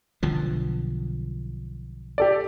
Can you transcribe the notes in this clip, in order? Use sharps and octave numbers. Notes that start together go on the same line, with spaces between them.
B1 D3 F3
G4 A4 D5